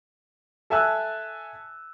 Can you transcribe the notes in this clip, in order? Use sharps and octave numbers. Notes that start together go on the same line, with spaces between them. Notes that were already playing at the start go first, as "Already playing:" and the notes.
A4 E5 G#5 A5 E6 F#6